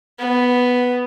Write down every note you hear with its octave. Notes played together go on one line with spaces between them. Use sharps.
B3